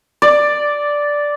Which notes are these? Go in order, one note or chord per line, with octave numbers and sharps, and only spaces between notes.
D5